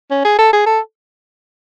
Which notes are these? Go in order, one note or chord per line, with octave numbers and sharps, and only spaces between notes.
C#4
G#4
A4
G#4
A4